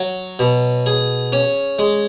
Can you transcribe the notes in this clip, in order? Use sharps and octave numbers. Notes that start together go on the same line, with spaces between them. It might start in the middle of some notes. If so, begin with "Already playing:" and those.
Already playing: F#3
B2
G#4
C#4
G#3